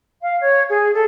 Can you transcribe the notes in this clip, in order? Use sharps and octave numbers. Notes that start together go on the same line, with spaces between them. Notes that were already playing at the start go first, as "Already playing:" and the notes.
F5
C#5
G#4
A4